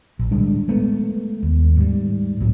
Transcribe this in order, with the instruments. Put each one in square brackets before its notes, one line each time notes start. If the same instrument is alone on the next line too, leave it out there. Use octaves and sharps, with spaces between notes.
[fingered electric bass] A#1
D1 G3 G#3 D4
G#3 A3 B3
D#2
G#2 G3
C2 A2 C3 F#3